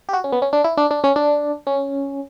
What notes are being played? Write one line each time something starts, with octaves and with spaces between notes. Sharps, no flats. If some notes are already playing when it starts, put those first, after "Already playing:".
G4
F#4
C#4
B3
C#4
D4
E4
D4
D4
C#4
D4
C#4